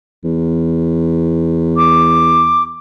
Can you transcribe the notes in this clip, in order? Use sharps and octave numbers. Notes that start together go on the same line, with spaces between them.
E2
D6